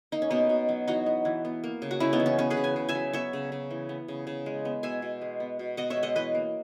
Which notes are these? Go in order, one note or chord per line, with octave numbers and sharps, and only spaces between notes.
A#3 D#4
C#4
B2 B3 D#4
B2
F#3
E3 D#4 F#4
B3
E3
B3
A#3
C#3
F#4
C#3 C#4 E4
B3 D#4
E3
C#4
B3 C#4
G#4 B4
C#3
G#5
C#3
E5 G#5
F#3
B3 C#5 E5
C#3
C#3
E3
B3
C#3
C#3
G#3
B3
B2 E5 G#5
B2
G#3
B3
B2
B2 D#5 F#5
C#5 E5
G#3
D#5 F#5
E3 B4 D#5
A#3